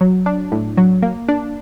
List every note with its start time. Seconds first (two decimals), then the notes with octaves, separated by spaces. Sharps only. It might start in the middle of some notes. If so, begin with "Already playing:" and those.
0.01 F#3
0.26 D4
0.52 A2
0.77 F#3
1.03 A#3
1.28 D4